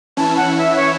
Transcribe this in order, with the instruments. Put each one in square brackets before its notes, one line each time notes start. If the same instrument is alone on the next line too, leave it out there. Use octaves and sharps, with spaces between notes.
[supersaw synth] E3 C#4 E4 [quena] A5
[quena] F#5
E5
C#5